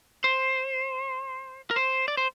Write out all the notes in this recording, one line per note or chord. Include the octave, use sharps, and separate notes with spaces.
C5
A#4
C5
D5
C5